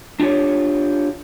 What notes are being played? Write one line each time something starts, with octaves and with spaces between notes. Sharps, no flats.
D4 F4 G4 C#5